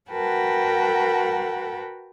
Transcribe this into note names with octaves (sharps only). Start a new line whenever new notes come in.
F#4 A#4 B4 F#5 G5 A5